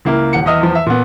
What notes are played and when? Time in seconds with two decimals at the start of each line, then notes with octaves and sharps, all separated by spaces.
0.05 C#2 A#3 E4
0.33 D#1 F#5 C#7
0.46 E2 D#5 E5 D#6 F6
0.61 E2 F3
0.75 E5
0.86 A#2 B3